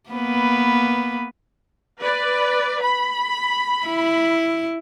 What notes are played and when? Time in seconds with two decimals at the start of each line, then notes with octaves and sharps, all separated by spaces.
0.10 A#3 B3 B4
2.00 B4 D5
2.81 B5
3.86 E4